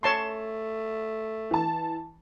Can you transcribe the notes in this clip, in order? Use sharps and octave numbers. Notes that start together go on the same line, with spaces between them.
A3 C#5 A5 C6
E3 A5